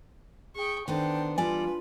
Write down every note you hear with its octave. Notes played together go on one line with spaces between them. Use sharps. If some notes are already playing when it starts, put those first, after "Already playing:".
G#4 G5 C#6
D#3 B3 D4 A4 C5 G5
E2 G3 F4 B4 D5 G#5